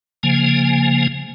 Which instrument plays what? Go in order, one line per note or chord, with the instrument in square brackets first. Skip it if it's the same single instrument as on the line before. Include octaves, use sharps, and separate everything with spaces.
[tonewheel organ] C#3 F3 A#3 G#5